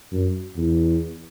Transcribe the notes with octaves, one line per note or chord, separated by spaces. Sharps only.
F#2
E2